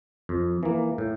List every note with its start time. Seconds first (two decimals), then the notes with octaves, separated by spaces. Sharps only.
0.29 F2
0.63 E3 A#3
0.98 A2